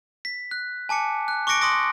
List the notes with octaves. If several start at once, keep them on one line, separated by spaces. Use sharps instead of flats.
B6
F#6
G#5 A5 D6 C#7
F#6
C#6 D6 F#6 A#6 C#7 D7
C6 D6 D#6 A#6 D7